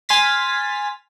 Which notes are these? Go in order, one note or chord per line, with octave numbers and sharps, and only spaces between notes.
G#5 C6 F6 A6 B6